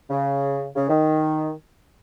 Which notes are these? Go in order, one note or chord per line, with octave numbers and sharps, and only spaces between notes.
C#3
C#3
D#3